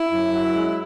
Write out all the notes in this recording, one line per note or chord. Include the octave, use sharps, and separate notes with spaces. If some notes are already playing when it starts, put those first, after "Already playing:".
Already playing: E4
F#2
F#3
G#3